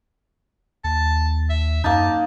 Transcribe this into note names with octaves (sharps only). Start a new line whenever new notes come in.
D#2 A5
E5
F#2 A#3 D#4 A5